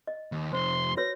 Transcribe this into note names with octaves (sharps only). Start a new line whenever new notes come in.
D#5
D#2
F2 C3 C5 C6
F#4 B4 C#5 A#6